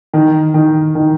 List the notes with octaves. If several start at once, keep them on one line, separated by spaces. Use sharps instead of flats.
D#3
D#3
D#3